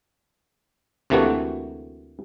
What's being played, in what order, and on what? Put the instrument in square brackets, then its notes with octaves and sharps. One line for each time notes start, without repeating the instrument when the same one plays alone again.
[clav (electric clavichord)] D2 C3 E3 A3 A#3 F#4